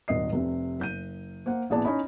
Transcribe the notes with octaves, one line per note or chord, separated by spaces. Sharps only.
D#1 G#1 D#5 C7
F1 C3
F#1 G6 D#7
A#3 C5 F#5
A1 A#2 B3 G#4 D5 A5
C#4 D#4 C#5 D#5 B5